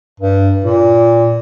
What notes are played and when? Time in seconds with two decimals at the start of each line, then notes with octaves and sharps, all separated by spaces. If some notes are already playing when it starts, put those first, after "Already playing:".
0.20 G2
0.64 A#2